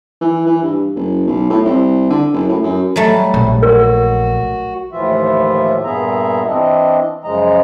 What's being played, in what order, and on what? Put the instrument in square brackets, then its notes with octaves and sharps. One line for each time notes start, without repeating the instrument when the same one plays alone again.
[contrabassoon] E3
E3
G2
F#1
B1
A2
C2
D3
F#1
A2
F#2
[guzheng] F#3 A3 [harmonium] G3
[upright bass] A#1
[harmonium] F#4 [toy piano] A#4
[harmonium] D#2 A2 E3 F3 F4 E5
G2 A#2 B3 G#4 E5 A#5
E3 C4 D4 D#5
F#2 C#3 F3 G#3 D#5 A#5